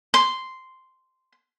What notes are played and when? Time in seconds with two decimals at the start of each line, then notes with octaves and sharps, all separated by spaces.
0.14 C6